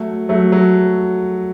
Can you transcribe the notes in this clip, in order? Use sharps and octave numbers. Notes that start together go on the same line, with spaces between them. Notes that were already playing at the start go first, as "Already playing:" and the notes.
Already playing: F#3 A3
F#3 A3
F#3